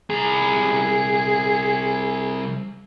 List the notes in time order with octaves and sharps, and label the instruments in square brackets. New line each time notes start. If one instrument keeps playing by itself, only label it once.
[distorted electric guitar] C2 A#5 [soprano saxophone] G#4